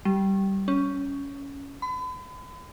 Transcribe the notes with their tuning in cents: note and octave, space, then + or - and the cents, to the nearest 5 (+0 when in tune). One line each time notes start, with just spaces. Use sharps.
G3 -15
C#4 +10
B5 +40